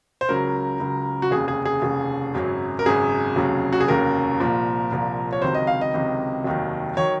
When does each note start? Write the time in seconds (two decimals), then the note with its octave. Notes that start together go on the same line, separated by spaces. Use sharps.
0.21 C5
0.28 C#2 C#3 F#3 A#4
0.80 C#2 C#3 F#3
1.22 F#4
1.31 F1 D#2 C#3 G#4
1.48 G#4
1.65 G#4
1.82 F1 D#2 C#3
2.34 G#1 F#2 C#3 F#3
2.79 A#4
2.86 G#1 F#2 C#3 F#3 G#4
3.36 F1 D#2 C#3 F#3
3.73 F#4
3.81 G#4
3.88 F1 D#2 C#3 F#3 A#4
4.40 C2 A#2 F3
4.91 C2 A#2 F3
5.32 C#5
5.42 C#2 C3 D#3 F#3 C5
5.55 D#5
5.67 F5
5.81 D#5
5.94 C#2 C3 D#3 F#3
6.44 F1 D#2 D#3 F#3
6.97 D#3 F#3 C#5